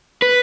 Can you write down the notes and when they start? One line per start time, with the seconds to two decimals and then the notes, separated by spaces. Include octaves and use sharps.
0.22 B4